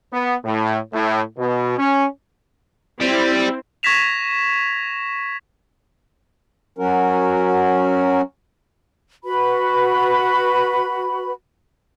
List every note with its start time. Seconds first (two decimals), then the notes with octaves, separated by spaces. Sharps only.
0.13 B3
0.45 A2
0.93 A2
1.38 B2
1.78 C#4
3.01 G3 C4 E4
3.83 C#6 G#6 A#6 B6 E7 F7
6.78 F#3 C#4 F#4 A#4
9.24 F#4 B4 B5